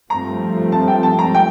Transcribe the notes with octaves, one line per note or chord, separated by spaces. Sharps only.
G2 F3 A3 C4 A#5
A5
G5
A5
A#5
G5